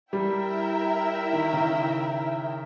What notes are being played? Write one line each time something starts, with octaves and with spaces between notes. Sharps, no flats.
G3 E4 A#4 E5 G5
D#3
C#3